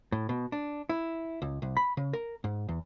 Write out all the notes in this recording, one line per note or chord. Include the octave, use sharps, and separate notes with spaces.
A2
B2
D4
E4
C#2
C2
B5
C#3
A#4
G#2
E2